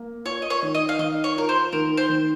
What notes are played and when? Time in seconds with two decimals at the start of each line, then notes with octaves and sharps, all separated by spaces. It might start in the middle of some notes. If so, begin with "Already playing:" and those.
Already playing: A#3
0.25 F4 C#5
0.42 D#5
0.50 C#5
0.62 D#3
0.75 D#5
0.89 F5
0.99 D#3 D#5
1.24 C#5
1.37 F4 A#4
1.49 C5
1.72 D#3 A#4
1.97 C5
2.09 D#3